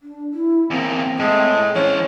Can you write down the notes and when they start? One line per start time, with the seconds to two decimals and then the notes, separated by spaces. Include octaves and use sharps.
0.02 D4
0.33 E4
0.70 E2 A#3 C4
1.19 A2 G#3
1.76 E3 C#4 C5